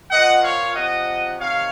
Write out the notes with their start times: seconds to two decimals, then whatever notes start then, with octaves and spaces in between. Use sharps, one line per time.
0.11 A#2 F3 D#5 F#5
0.43 C#5 F5
0.75 C3 F3 D#5 F#5
1.40 C3 D#3 C#5 F5